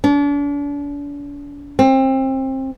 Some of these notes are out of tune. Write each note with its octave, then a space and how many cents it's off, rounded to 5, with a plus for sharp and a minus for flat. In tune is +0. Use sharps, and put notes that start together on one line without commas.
D4 -40
C4 +25